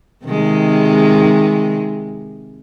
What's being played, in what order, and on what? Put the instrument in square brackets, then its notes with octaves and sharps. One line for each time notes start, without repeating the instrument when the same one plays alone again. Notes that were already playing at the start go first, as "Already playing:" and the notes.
[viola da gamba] C3 D#3 G#3